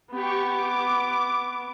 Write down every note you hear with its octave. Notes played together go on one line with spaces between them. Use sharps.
B3 G4 C#6
D6